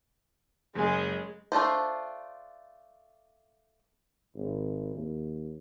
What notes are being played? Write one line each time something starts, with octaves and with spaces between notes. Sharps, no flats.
F#1 G#3 G#5
A3 D4 F4 C5
G#1
D#2